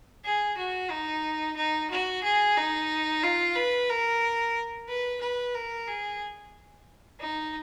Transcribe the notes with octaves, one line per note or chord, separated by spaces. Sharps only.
G#4
F#4
D#4
D#4
F#4
G#4
D#4
F4
B4
A#4
B4
B4
A#4
G#4
D#4